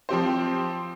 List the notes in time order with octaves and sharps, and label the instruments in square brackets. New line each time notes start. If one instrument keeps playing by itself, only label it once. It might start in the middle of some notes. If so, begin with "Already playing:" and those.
[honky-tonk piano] F3 C4 G4 C5